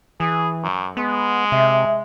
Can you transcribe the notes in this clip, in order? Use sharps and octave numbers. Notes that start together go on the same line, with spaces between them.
E3 G#4
F#2
G#3 B3
C3 E5